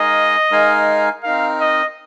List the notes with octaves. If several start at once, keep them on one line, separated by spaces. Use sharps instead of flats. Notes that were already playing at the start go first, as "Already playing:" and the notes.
Already playing: G#3 D#4 A#4 D#5 F5 G#5
G#3 D#4 A#4 F5 G#5
C4 D#4 A#4 F5
D#5